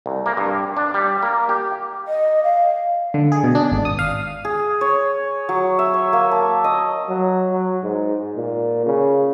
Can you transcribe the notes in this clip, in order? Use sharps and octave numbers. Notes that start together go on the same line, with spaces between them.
C2
A#3
G2
D4
G3
A#3
G4
D#5
F5
D3
G#4
B2
D4
G#1
D#6
F5
G#4
C#5
F#3
E5
C#5
A#3
A5
D#5
F#3
F#3
G#2
A#2
C#3